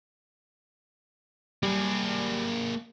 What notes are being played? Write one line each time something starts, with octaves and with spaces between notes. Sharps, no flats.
G3 A#3 G#4